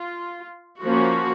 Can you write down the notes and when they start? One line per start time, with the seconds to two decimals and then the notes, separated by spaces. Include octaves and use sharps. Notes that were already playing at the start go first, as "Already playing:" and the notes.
Already playing: F4
0.83 F3 A#3 C#4 F#4